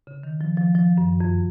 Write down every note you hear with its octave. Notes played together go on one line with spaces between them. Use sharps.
C#3
D#3
F3
F3
F3
F#2
F2